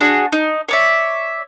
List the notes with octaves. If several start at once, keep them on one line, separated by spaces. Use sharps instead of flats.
D4 F#4 G#4
D#4
C#5 D5 E5